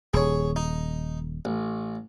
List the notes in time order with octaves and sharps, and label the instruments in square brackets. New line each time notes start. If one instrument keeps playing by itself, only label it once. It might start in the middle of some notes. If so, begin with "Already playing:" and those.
[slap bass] D#1 [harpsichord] G#4 C#5
[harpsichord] D#4
A1